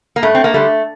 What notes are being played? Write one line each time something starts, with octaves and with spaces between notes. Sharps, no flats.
A#3
G2 A3
C4
A#3
D3 G3 A3